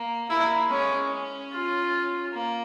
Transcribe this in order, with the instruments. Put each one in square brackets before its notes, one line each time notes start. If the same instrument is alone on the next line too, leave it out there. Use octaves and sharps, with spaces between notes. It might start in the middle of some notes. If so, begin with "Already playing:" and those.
Already playing: [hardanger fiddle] A#3
[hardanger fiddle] A#3 [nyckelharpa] E4
[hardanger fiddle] G#3 [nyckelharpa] C#4
[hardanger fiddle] C#4
[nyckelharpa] F4
[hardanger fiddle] A#3